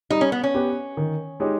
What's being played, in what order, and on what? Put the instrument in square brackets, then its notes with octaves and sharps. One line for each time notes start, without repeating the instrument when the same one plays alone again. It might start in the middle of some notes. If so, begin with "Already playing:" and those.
[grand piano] G3 [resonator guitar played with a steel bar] D#4
[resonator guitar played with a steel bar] C#4
B3
C#4
[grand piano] B3 G4 B4
D#3
G#3 D#4 G4 C#5